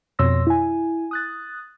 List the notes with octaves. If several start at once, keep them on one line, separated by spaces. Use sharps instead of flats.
F2 B2 C#5 C6 E6 A#6
E4 G#5
D#6 F#6 A6